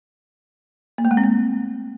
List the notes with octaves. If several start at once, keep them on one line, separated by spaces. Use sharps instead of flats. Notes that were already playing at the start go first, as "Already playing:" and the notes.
A#3
A3
G#3
C4
A#3